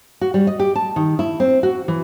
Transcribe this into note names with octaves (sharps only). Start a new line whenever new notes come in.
F#4
G3
D#5
G4
A5
D#3
E4
C4
F#4
E3